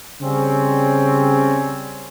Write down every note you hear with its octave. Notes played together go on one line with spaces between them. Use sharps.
C#3 G3 C4 C#4